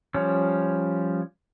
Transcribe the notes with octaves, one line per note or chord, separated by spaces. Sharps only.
F3 G3 C#4